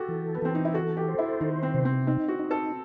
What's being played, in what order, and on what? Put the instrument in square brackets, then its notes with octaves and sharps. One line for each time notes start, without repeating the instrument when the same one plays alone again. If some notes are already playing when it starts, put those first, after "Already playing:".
Already playing: [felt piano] F#4 G4 [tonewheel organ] A4
[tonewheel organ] E3
[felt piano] B3
[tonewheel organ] E3 [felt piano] C4
[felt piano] D#4
E4
[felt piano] F#4 [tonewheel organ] A4
[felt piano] G4
[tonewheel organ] C5
[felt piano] E4
[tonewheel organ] D#3 [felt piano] D#4
[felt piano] C4
[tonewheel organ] C3
[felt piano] C4
[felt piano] C4 [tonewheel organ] D#4
[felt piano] F#4
[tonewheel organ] D#4
[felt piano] A4